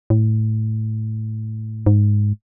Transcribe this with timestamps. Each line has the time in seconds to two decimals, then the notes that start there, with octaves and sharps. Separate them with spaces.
0.10 A2
1.86 G#2